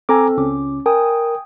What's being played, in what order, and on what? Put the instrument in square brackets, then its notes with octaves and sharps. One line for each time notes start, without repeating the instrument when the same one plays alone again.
[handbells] C4 A4 [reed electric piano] G#5 A#5 D6
[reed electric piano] C#2 [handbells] C#4 D6
[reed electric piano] A#4 [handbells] G5 G#5 D#6